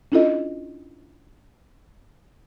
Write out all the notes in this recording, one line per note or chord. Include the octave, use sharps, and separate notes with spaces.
C#4 D4 E4 F4 A4 D#5